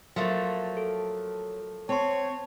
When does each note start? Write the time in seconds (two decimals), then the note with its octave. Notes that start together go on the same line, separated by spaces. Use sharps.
0.16 F3 F#3 A3 A#3
0.77 A4
1.89 C4 C#5 A5 C6